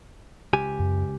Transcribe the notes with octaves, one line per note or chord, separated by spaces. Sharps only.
C#2 G4 G#5
F#2